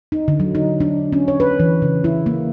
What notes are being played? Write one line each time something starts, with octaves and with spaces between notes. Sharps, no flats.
D#4
D3
F#3
D#4
D4
C#4
C#5
B4
E3
C#3
E4
A#3